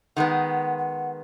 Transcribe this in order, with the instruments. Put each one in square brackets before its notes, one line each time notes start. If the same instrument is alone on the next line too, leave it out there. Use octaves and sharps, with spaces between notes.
[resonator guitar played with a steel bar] D#3 G#3 B3 [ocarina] F#5
[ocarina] F#5